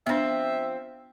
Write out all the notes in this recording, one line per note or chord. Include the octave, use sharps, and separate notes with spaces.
F3 B3 C4 D4 E5